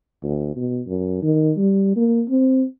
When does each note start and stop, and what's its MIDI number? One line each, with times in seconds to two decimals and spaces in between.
0.24 0.54 38
0.56 0.80 47
0.88 1.21 42
1.22 1.52 51
1.57 1.94 55
1.96 2.23 58
2.29 2.64 60